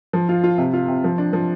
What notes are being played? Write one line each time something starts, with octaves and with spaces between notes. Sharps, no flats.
F3
F4
F4
C3
F4
C3
F3
D4
F3